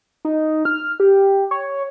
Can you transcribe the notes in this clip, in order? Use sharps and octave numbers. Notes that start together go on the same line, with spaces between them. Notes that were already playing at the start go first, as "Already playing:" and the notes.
D#4
F6
G4
C#5